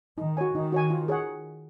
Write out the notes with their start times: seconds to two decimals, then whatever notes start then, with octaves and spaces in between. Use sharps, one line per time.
0.18 D#3 D#4
0.37 F#4 C#5 G#5
0.54 D#3 D#4
0.72 F#4 C#5 G#5
0.90 F4
1.08 G#4 C#5 F#5